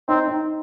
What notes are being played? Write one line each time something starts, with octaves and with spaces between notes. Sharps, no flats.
C4 D#4
D#4